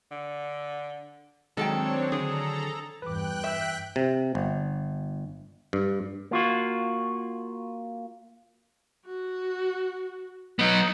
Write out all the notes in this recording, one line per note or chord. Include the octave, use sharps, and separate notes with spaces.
D3
D#3 F#3 G#3 C4 D4 A4 C#5 G5
D3 G#4 A4 A#5
E2 G2 B4 G5 D6 F#6
E5
C3
G1
G2
A#3 F4 F#4
F#4
F#3 B3 D#4